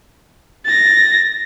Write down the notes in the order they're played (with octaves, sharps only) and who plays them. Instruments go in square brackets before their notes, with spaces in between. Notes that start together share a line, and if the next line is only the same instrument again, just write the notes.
[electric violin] A6 A#6